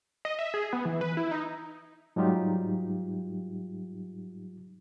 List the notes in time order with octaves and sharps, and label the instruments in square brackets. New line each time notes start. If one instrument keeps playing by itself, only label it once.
[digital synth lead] D#5
E5
G#4
B3
E3
B4
E4
D#4
[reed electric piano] G#2 F#3 G3 D#4 F4 G4